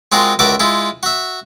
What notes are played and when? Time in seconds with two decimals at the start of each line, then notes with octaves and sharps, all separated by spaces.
0.12 G#3 C4 F4 F#4 G#4 A#4
0.39 C#2 F#4 A#4 D5 E5 D6
0.60 G#3 E4 F4
1.03 F#4 E5